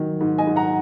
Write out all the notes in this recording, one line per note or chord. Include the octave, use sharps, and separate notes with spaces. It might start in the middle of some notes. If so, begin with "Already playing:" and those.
Already playing: D#3 F#3
G#2
D#5 G#5
G#2
F#5 A#5